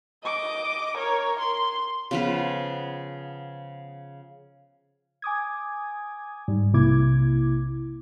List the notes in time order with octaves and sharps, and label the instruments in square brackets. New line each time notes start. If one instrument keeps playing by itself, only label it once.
[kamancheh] D#5 D6
A#4 C#5
C6
[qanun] C#3 F3 B3
[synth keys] G#5 D6 D#6 G#6
G#2 G3
B1 C3 A#3 E4 D6 G#6